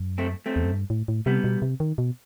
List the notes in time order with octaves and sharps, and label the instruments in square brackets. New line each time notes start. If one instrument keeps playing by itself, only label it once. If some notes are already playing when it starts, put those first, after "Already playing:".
Already playing: [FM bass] F#2
[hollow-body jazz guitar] A3 C4
A3 C4
[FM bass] E2
F#2
G2
A2
A2
[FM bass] C3 [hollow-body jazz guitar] G3 B3
[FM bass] B2
C3
D#3
B2